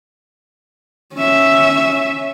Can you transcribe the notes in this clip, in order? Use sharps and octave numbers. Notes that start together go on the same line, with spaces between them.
C#4 E5